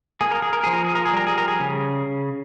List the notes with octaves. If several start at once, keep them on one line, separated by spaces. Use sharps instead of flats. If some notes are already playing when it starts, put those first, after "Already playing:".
A#3 G#4
A#4
G#4
A#4
F3 G#4
A#4
G#4
A#4
G#4
G3 A#4
G#4
A#4
G#4
C#3